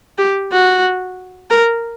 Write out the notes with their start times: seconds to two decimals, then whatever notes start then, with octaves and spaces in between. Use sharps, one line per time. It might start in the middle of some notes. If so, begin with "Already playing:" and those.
0.18 G4
0.52 F#4
1.50 A#4